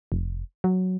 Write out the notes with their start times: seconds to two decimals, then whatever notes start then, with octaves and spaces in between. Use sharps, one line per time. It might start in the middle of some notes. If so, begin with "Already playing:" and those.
0.12 F1
0.64 F#3